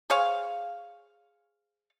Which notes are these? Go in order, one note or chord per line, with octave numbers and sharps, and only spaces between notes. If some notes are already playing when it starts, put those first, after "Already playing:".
G#4 C5 C#5 F5